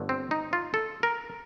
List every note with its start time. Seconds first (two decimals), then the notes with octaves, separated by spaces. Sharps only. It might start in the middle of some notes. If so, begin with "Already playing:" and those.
Already playing: G1 G2 D3 A3
0.09 C4
0.31 D#4
0.53 F4
0.74 A4
1.03 A#4